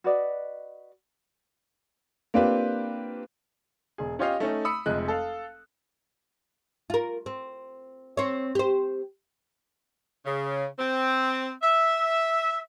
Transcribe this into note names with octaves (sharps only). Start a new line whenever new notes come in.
F#4 B4 D5 D#5
A#3 C4 D4 F4 G4 B4
E1 G#4
C#4 F4 G4 C#5 D#5 F5
A3 C#4 D#4
B5 D#6 E6 C#7
F1 F2 G#3 F#6
A4 F5
F4 A#4
C4
C4 C#5
G4 C5
C#3
C4
E5